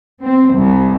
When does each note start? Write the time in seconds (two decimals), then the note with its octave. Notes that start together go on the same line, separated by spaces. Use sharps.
0.20 C4
0.52 C2